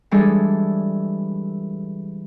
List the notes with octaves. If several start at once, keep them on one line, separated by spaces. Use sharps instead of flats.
E3 G3 G#3 D4 G#4 A4